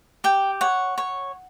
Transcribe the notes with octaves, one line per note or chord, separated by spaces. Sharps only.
G4 G5
C#5 F#5
C#5